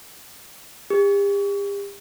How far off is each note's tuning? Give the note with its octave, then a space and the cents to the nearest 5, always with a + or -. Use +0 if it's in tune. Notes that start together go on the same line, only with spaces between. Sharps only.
G4 +40